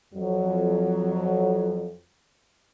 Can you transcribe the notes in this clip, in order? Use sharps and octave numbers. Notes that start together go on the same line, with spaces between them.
F2 F#3